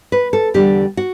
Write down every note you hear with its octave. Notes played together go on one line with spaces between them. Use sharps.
B4
A4
E2 D3 G3 D4 G4
F#4